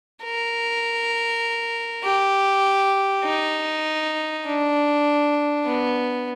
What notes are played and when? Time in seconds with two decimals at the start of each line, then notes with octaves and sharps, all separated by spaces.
0.24 A#4
2.05 G4
3.25 D#4
4.46 D4
5.66 B3